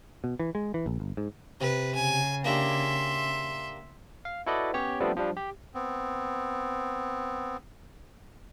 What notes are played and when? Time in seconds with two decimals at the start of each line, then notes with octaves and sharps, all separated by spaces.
0.24 B2
0.40 E3
0.55 G#3
0.74 E3
0.86 A#1
1.00 G1
1.17 G#2
1.61 C3 B4
1.95 C#3 G#5
2.45 A#3 D4 G4 E5 C6
4.25 F5
4.46 E4 F#4 A4 B4 D5 D#5
4.73 B3 C#4 G4 C#5
5.00 F3 G3 A3 B3 C4 D4
5.16 F3 G3 D4
5.37 G4
5.75 B3 C4